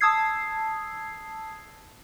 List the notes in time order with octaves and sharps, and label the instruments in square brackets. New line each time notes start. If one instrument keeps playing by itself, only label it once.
[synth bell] A5 D#6 E6 G#6 C7